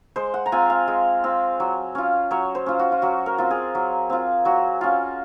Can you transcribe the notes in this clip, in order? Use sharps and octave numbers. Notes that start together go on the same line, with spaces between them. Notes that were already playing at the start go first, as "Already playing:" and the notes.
G#3 C5
F#5
A#5
C4 F4 G#5
F5
G#3
C4 F4
F#3
C#4 F4
F#3 C#5
C5
C#4 F4
F#4
F4
F#3 F#4
A#4
C4 F4
G#4
F#3
C4 F4
F#3 F#4
C#4 F4